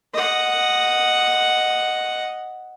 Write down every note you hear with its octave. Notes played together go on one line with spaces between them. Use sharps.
D#5 F#5